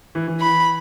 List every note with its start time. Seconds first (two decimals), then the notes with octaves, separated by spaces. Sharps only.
0.15 E3
0.28 E3
0.40 B5